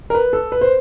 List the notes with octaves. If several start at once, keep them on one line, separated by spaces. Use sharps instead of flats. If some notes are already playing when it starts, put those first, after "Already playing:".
A#4
B4
A4
B4
C5